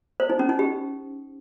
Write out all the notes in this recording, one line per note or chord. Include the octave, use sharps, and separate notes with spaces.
C5
D#4
C#4
D#4
G4